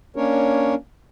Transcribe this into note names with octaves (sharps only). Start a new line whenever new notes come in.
A#3 C#4 D4 A#4 C#5